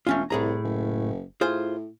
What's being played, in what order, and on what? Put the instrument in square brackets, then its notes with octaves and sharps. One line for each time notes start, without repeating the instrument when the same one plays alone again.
[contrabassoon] E1 [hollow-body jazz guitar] A3 C#4 F4
[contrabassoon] C2 [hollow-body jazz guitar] A2 G#4 A#5
[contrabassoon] F#1
[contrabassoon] A2 [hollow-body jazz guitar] F4 G#4 C5